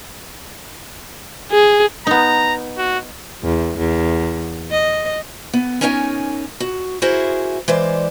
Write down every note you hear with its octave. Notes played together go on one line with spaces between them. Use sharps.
G#4
B3 D#4 A#5
F#4
E2
E2
D#5
B3
C#4 D#4 A#4 C#5 F5 G#5
F#4
E4 F#4 G#4 A#4 C5
E3 G#3 C5 D5